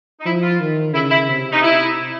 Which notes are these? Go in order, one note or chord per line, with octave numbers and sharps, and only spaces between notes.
D#4
F3 E4
F4
D#3
C#3 E4
E4
C3
D#4
E4